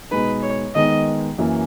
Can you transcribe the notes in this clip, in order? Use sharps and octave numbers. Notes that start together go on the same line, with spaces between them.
B2 G#3 D#4 B4
C#5
D#3 G#3 B3 D#4 D#5
F#2 E3 A#3 E4